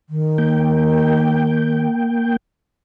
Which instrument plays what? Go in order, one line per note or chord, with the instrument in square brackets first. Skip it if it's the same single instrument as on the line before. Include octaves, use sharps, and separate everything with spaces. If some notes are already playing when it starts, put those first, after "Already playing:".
[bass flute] D#3
[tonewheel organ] A#3 G5